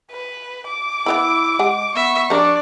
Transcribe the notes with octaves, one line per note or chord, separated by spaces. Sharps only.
B4
D6
E3 B3 E4 B5
G#3 G4 F#5 G#5
B3 E5 C#6
F3 G3 D4 A#4 D5